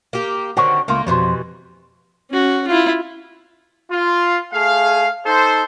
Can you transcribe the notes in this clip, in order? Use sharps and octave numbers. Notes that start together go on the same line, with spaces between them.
A#3 G4
D3 D#3 C4 F#4 C#5
C#2 A3 A#3 F4
F2 B2 E3 G3 C5
C#4 F#4
E4 F4
F4
A3 G#4 F5
D#4 A4 C5